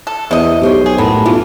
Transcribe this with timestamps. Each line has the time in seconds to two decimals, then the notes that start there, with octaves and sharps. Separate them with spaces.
0.07 A4
0.31 E2 C3 D#5
0.61 B1 G4 C5 C#5
0.86 G#4
0.98 A2 B3 A#4
1.26 B1 E3 F4